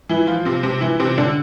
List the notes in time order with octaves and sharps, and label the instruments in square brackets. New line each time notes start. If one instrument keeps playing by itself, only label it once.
[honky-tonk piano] E3 E4
F3 F4
C3 C4
C3 C4
E3 E4
C3 C4
D3 D4